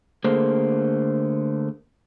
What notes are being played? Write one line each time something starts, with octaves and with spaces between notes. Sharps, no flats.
D3 A3 A#3 G#4 A#4 C5